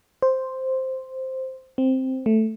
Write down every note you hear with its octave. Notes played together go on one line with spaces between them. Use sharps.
C5
C4
A3